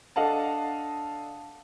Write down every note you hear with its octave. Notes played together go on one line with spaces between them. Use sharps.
D4 A4 D#5 F5 F#5 A5